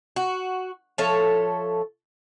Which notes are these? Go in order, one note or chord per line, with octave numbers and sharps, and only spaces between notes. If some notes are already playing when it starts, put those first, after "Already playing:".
F#4
F3 A4 C#5 E5